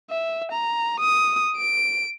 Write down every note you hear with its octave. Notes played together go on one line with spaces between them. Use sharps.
E5
A#5
D#6
D7